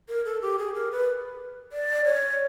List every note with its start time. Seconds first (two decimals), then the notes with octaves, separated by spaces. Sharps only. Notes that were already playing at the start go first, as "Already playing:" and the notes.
0.09 A#4
0.25 A4
0.42 G4
0.58 G#4
0.74 A#4
0.91 B4
1.72 D5
2.05 C#5